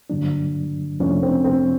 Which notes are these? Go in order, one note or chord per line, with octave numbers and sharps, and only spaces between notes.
G2 D3 F#3 A#3 D4
F2 C3 F3 A3 C#4 D4
C4
C4